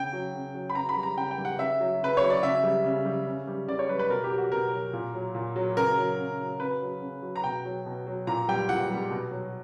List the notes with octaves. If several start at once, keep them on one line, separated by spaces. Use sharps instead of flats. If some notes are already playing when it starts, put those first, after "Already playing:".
Already playing: C#3 G5
F#3
C#3
F#3
B5
C#3 A#5
B5
G3
A#5
C#3 G5
G5
G3
F#5
C#3 E5
F#3
C#3 B4
F#3 C#5
D5
C#3 E5
G3
C#3
G3
C#3
G3
C#3 D5
C#5
G3 B4
B4
B2 A#4
G4
F#3
F#4
B2 A#4
F#3
A#2
F#3
A#2
F#3
C#3 A#4
F#3
C#3
F#3
C#3 B4
F#3
C#3
F#3
A#5
B2 G5
F#3
B2
F#3
A#2 A#5
G3 G5
A#2 F#5
G3
B2
F#3